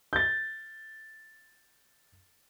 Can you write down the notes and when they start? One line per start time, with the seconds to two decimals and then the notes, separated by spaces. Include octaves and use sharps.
0.13 G6 A6